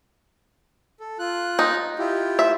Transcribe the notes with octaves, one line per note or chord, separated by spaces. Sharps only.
A4
F4 F#6
D#4
E4 F4 G4
E5